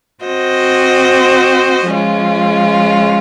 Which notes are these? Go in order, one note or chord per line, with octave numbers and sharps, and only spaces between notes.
C4 F#4 C5 D#5
F3 G#3 C#4 F4